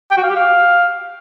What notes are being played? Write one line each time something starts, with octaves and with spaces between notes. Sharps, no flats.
G5
F#4
F5
G4
F5